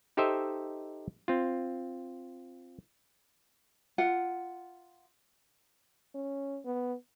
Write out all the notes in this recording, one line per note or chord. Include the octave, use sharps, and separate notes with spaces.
D#4 G4 A4 C5 D#5 E5
C4 F4
F4 F#5
C#4
B3